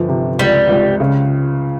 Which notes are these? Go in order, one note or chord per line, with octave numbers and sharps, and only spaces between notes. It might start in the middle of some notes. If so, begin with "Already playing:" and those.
Already playing: G1 F3
C3
C#2 G3
C#2
C#3